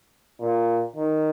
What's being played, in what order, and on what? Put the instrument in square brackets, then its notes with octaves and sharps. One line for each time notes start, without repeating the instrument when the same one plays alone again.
[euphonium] A#2
D#3